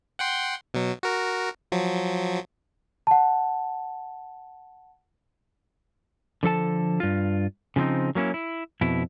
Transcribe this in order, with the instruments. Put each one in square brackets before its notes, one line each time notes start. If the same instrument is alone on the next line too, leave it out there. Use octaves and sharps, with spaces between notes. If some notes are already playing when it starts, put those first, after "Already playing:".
[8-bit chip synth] F#5 G5 C6
B2 F#3
F#4 A#4
F3 F#3
[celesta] F#5 A5
[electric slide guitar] D3 F3 A4 A5
G2 F4
C#3 F3 F#3 C4 D#4
F#3 A#3 C#4 E4
E4
F2 B2 E4